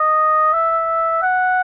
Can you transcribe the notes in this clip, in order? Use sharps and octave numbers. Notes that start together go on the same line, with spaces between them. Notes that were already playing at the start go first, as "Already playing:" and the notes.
Already playing: D#5
E5
F#5